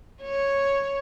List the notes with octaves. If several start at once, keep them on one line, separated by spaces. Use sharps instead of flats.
C#5